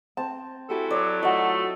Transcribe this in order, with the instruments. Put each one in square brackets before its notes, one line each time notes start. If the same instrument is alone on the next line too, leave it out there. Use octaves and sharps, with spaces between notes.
[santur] C4 [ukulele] A5
[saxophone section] E4 F#4 A4 [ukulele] G4 G#5
[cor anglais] F#3 [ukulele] C#5 [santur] D5
[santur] F#3 D#5 [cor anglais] A3 [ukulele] F4 F#5